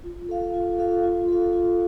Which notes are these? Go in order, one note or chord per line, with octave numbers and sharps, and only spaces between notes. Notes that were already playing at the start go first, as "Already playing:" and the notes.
F4
A4 F5
F4
A4 F5
F4
A4 F5
F4